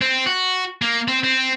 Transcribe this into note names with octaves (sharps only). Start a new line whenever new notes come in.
C4
F#4
A#3
C4
C4